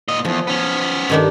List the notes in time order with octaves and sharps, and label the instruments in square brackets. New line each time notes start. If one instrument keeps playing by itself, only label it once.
[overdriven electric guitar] A#2 D#5
[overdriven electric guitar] E2 G#2 [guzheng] F3
[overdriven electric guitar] B3 C#4
[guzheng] G2 D#3 D4